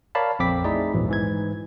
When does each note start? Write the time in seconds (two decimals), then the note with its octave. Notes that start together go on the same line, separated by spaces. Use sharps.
0.15 A#4 C#5 D5 F5 A5 B5
0.39 A#1 F2 C4 D6 B6
0.64 A3 D#4 E4 G#4 D5
0.93 A#1 E2 G#2 E3 F#3
1.09 G#2 E3 G#6